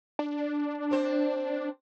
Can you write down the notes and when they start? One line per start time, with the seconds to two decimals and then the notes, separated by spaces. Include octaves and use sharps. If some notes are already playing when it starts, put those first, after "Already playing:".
0.19 D4
0.91 C4 C5